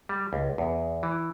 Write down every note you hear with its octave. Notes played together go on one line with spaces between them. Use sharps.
G3
C#2
E2
E3